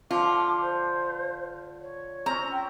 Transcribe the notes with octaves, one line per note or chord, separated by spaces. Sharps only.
D3 F3 F4 D6
C5
C#5
C4 C#4 A#5
G5